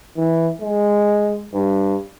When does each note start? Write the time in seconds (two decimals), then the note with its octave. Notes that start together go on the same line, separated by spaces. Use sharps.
0.17 E3
0.61 G#3
1.54 G2